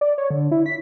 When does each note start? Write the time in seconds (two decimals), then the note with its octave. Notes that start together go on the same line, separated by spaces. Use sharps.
0.01 D5
0.18 C#5
0.30 D3
0.51 E4
0.66 B6